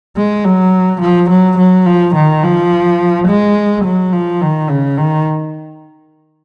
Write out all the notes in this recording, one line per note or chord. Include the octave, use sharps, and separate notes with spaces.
G#3
F#3
F3
F#3
F#3
F3
D#3
F3
G#3
F#3
F3
D#3
C#3
D#3